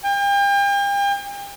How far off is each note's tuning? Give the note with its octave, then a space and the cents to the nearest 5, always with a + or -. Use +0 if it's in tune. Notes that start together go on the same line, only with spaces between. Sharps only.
G5 +40